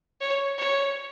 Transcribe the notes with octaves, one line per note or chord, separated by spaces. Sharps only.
C#5
C#5